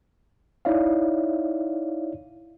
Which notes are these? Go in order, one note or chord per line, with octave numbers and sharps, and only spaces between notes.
D#4 E4 C#5 D5 E5 F5